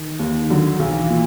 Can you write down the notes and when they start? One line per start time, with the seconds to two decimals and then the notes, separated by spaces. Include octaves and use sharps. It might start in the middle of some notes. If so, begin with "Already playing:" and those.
Already playing: D#3
0.19 D#2
0.50 D3 F#3
0.79 B1 E3
1.10 A#2